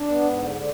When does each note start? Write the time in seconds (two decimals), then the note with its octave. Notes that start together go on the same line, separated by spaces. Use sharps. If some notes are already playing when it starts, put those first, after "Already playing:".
Already playing: D4
0.08 B3
0.22 G#2
0.37 D3
0.53 D3